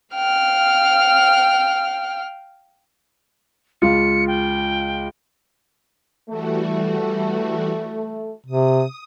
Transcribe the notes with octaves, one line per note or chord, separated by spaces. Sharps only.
F5 G5 F6
C#2 F4 C#7
G5
E3 G3 A3 F#4
C3 D#6